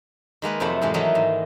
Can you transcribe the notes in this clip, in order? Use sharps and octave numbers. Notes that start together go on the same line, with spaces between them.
D#3 G#3 A#3 B4
F2 C3 F3 F#3 A3 B5
G#2 C3 E3 G#3
D#3 E3 F#3 A3 A#3 D#4
G#2